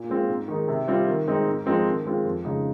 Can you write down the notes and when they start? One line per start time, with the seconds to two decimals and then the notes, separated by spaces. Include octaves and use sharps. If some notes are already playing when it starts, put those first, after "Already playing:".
Already playing: A#2
0.09 G#3 C4 F4
0.28 G#2
0.48 D#3 G#3 D#4
0.68 C3
0.88 G3 C4 F4
1.07 D#3
1.27 G#3 C4 D#4
1.47 G#2
1.66 F3 G#3 C4 D#4
1.85 D#3
2.06 G#3 C4 F4
2.24 F2
2.44 C#3 G#3 D#4